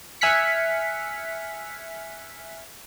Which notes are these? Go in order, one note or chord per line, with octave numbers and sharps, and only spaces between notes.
E5 G#5 F6 F#6 B6 C#7